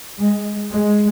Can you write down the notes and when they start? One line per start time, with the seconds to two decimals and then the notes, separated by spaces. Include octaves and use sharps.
0.19 G#3
0.72 G#3